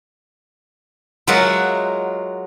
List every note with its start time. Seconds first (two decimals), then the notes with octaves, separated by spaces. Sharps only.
1.27 F#3 G#3 F4 A#4 E5 F#5